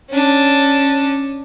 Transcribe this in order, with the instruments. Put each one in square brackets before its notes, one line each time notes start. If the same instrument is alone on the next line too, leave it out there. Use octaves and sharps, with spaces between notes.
[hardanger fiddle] C#4 D4